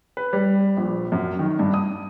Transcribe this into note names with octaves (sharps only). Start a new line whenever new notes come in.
B4
G3
A#1
F#2
D#3
G2
D#6